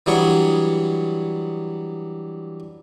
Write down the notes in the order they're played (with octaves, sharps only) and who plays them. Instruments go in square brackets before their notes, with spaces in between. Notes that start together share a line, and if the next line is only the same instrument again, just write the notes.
[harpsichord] E3 F#3 G3 D4 G#4 C#5